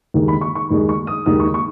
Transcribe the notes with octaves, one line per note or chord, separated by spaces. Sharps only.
D#2 D#3 G#3
B5
C#6
C#6
D#2 D#3 G#3
C#6
D#6
D#2 D#3 G#3 D#6
C#6
C#6